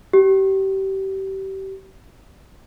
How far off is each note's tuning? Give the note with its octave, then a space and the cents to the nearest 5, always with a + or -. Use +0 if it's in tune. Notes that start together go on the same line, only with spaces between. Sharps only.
G4 -30